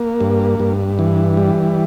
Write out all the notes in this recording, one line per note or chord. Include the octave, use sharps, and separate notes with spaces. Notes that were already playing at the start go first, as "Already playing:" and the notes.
Already playing: A#3
G2
G2
E3
G3